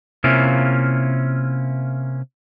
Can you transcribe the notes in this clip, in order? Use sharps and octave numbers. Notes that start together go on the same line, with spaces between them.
C3 A#3 C#4 E4 F4